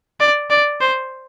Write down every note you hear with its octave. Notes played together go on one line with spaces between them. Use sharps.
D5
D5
C5